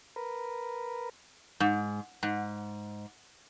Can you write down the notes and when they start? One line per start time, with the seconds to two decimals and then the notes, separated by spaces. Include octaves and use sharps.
0.16 A#4 B4
1.60 G#2
2.23 G#2